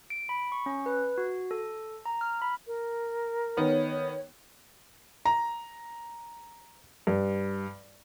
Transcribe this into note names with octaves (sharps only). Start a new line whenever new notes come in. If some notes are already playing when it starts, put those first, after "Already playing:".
D7
B5
C#6
C#4
B4
F#4
A4
A#5
F6
B5
A#4
D#3 B3 C#5
A#5
G2